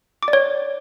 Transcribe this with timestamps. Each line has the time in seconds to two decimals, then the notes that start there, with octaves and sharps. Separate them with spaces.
0.23 D6
0.28 D5
0.33 C#5